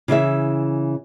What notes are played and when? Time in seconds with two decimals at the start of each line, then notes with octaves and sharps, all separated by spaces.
0.08 C#3 E3 E4 E5